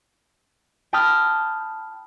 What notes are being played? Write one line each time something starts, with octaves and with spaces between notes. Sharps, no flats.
G5 A5 B5 D#6 F6 G6